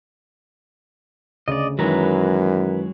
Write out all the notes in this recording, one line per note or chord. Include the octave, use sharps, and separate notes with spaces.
D2 C#3 D5 D#5
F#2 D#3 E3 F#3 G#3 B4 A#5